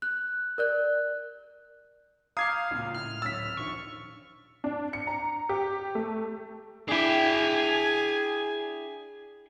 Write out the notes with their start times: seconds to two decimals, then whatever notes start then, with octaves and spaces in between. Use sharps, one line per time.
0.02 F#6
0.58 A#4 D5 F#6
2.37 F5 A#5 D6 D#6 G6 G#6 C7
2.71 C#2 A#2
2.94 A2 F6
3.22 D1 C#4 E6 A6 B6
3.57 A#1 D#2 C#6
4.64 D4
4.93 C#7
5.07 A#5
5.49 G4
5.95 A3
6.89 D4 E4 G#4 G5 G#5